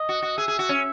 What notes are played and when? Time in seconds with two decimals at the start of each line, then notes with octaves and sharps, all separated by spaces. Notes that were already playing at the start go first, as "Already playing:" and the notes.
Already playing: D#5
0.09 F#4
0.22 F#4
0.37 G#4 E5
0.48 G#4
0.59 F#4
0.69 C#4